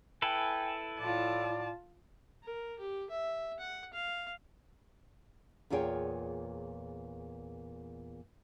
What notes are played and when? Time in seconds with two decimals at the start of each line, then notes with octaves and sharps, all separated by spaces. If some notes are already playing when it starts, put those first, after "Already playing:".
0.22 E4 A4 B4 G5 G#5
1.00 A2 F4 D5 A5
2.44 A#4
2.79 G4
3.11 E5
3.59 F#5
3.93 F5
5.70 E2 A#2 F4 G#4 C#5 G5